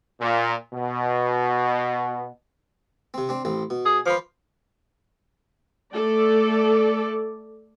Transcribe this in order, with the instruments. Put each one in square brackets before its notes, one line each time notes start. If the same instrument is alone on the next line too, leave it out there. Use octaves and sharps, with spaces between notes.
[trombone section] A#2
B2
[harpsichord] C3 C4
C4 D4
A1 C4
B2
[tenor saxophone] G#4
[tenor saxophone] F3 [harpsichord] B4 C5 D6
[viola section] A3 A4 D5